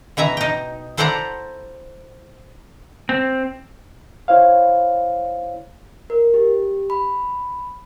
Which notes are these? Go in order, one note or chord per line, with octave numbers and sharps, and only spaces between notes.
B2 E3 E5 A#5
D#4 G5
E4 A4 C5 D5 F#5 A#5
C4
E4 C5 C#5 F5
A#4
G4
B5